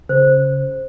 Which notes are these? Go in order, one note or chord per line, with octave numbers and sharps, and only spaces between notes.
C#3 C5